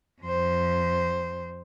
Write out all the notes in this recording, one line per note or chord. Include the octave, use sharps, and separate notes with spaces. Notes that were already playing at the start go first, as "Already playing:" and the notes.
F2 C5